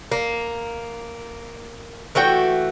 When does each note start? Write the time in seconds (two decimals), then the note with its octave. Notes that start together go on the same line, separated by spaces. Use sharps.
0.12 A#3
2.15 E3 A3 F#4 G5